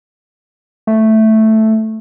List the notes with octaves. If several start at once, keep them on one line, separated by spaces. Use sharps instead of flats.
A3